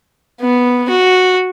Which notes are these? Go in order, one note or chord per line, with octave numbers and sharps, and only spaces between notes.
B3
F#4